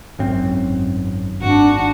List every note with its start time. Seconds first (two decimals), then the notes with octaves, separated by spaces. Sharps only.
0.19 G#1 F#2 C4
1.41 G#1 D4 F#4